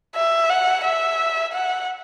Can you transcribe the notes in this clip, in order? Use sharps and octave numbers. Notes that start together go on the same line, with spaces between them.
E5
F#5
E5
F#5